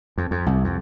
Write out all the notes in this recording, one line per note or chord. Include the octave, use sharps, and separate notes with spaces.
F2
F2
C2
F2